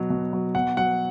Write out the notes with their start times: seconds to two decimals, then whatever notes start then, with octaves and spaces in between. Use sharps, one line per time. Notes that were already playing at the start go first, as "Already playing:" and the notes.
Already playing: B2 F#3
0.10 B2
0.33 F#3
0.55 B2 F#5
0.77 F#3 F#5